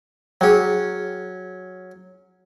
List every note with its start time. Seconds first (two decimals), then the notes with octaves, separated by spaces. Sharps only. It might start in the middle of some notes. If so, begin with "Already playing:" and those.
0.41 F#3 C#4 G#4 G5